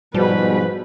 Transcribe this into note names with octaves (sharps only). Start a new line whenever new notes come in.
G#2 B2 F3 G3 B4 B5